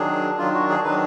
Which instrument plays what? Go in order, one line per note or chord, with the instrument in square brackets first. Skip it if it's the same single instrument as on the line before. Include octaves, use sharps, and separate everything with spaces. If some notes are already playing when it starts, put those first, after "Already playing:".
Already playing: [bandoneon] D#3 F#3 D4 G#4
D#3 F#3 D4 F4
F#4
G#4
D#3 F#3 D4 B4